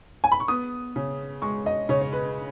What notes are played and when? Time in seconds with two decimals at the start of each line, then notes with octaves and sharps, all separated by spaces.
0.24 G#5
0.32 B5
0.40 C#6
0.48 B3 D#6
0.96 C#3
1.42 G#3 C#6
1.66 D#5
1.89 C#3 C#5
2.01 C#5
2.13 B4